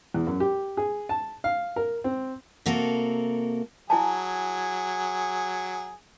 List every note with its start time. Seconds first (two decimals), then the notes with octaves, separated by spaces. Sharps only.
0.14 E2
0.27 F#2
0.40 G4
0.77 G#4
1.09 A5
1.44 F5
1.76 A#4
2.04 C4
2.66 C3 A#3 F#4 A4 A#4
3.90 F#3 E4 G#4 G#5 A5